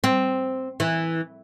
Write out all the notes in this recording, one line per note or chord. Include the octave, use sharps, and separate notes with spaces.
C4
E3